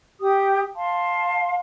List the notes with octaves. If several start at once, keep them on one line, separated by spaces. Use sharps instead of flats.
G4 D#6
F5 A5 C6